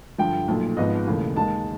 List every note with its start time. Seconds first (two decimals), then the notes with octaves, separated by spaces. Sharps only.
0.18 G2 D3 F3 G5
0.48 B1 A#2 F3 A3
0.77 G#1 G#2 F3 G#3 B3 D#5
1.07 E1 D#2 C#3 E3 A3
1.36 D#2 D#3 G#3 A5